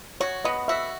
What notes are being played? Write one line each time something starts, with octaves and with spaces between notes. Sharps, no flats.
F#4 C#5
B3 D#5
F#4 E5